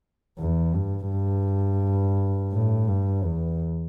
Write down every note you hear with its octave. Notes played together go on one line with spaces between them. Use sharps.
E2
G2
G2
A2
G2
E2